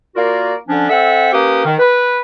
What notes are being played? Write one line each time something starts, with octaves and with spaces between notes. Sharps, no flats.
A#3 F4 F#4 A#4 D5
D3 F3 C#4 D4
C4 A4 E5 F#5
A#3 C#4 G4 B4 D#6
D#3
B4